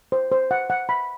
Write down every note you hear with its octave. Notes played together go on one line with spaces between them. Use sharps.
C5
C5
F#5
F#5
B5